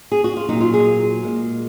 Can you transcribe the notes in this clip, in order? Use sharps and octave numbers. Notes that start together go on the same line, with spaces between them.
G#4
F#4
F4
A#2 F#3 D#4
F4
G#4
A#2 G#3